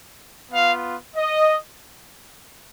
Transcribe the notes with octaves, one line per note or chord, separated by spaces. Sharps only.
B3 F4 F5
D#5